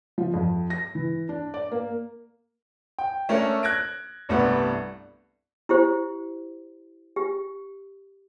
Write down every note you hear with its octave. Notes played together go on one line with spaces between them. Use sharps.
F3
F2
A#6
E3
D4
D5
A#3
G5
A3 C#4 D4 A4 A#4
F#6 G#6 A#6 D7
C2 G2 A3 B3
E4 G4 C5
G4